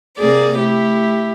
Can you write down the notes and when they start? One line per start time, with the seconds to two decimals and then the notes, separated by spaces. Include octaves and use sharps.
0.18 C3 A#3 G#4 D5 D6
0.58 A3 E4 G4